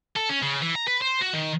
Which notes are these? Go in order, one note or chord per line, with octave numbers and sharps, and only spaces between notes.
A4
C#4
C#3
E3
A#5
B4
C5
F#4
D#3